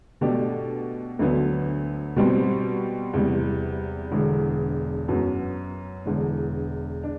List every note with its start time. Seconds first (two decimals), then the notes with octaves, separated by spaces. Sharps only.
0.21 B2 A3 D4 G4
1.19 D2 D3 F#3 B3
2.16 B2 G3 C4
3.13 E2 C3 G3
4.11 E1 E2 D3
5.08 F#2 F#3 B3
6.06 E1 E2 D3
7.03 D4